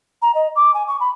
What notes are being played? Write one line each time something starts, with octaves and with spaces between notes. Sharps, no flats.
A#5
D#5
D6
G#5
C#6
B5